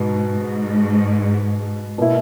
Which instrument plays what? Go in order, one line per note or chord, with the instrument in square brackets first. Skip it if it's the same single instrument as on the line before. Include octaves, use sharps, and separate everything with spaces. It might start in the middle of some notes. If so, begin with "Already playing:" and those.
Already playing: [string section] G#2 [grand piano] B2
[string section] G#2
[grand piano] B2 A#3 E4